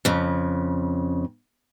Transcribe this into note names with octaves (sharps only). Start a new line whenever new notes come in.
F2 C#3